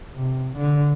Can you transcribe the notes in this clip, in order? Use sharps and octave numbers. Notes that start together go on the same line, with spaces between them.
C3
D3